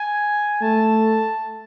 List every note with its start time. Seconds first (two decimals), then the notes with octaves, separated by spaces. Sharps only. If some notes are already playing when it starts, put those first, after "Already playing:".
Already playing: G#5
0.62 A3 A5